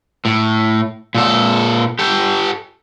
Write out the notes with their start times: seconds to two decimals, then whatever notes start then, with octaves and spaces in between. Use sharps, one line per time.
0.25 A2
1.15 A#2 A4
1.99 G4 A4